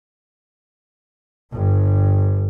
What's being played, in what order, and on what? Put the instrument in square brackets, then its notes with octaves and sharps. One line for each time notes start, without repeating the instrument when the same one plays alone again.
[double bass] G1 G2